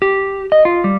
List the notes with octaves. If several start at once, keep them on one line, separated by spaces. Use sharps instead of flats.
G4
D#5
F4
G3